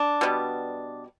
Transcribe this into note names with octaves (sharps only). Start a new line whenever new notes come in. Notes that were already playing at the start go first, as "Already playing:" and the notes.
Already playing: D4
B2 G3 B3